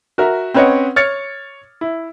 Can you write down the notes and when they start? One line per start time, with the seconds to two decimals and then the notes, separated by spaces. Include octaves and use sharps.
0.18 F#4 A#4 E5
0.54 C4 C#4 B4 C#5 D#5 F#5
0.96 C#5 F6 A6 C#7
1.81 E4